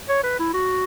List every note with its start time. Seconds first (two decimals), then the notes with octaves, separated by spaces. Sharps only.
0.09 C#5
0.24 B4
0.39 E4
0.54 F#4